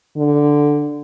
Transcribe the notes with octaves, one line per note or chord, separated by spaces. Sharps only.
D3